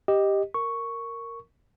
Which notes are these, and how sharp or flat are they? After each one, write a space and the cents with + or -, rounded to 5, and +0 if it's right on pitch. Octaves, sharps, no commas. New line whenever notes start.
G4 +5 D#5 +0
A#4 -10 C#6 +0